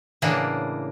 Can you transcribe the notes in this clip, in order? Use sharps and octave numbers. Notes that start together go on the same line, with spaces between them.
A2 C#3 E3 A#3 D4 F#5